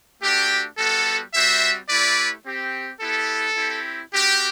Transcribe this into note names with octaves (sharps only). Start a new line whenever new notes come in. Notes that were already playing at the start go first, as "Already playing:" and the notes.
A3 D4 F#4 G4
G3 B3 F#4 A4
G3 C4 F#4 C5 E5
A3 E4 G4 B4 D5
C4 G4
B3 E4 G4 A4
C4 E4 G4
C4 F#4 G4